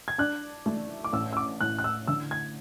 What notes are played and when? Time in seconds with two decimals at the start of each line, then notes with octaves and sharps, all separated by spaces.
0.08 G#6
0.18 D4 F#6
0.66 A3
1.04 D6
1.13 A1 E6
1.33 E6
1.37 D6
1.61 A2 F#6
1.78 F#6
1.84 E6
2.08 D3 E6
2.31 G#6